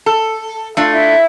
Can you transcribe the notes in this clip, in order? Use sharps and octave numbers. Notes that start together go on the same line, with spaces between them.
A4
A3 D4 F4
E4 E5